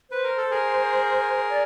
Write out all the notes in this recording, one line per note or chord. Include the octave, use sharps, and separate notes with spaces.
B4 C5
A#4
A4
G#4 A#4
D5